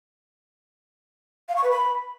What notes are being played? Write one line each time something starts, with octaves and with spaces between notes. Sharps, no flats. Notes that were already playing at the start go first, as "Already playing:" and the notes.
F5
C#6
B4
B5